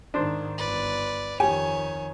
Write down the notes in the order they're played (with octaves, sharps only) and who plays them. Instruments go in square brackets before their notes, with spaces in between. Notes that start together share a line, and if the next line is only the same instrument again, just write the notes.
[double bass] G#2 D#3 [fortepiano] D4 C5
[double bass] G1 [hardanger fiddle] B4 D5
[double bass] F2 D#3 [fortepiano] G4 [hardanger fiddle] C#5 [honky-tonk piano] G#5